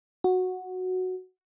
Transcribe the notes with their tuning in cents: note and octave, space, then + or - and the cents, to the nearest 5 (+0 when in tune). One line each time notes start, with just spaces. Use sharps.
F#4 -5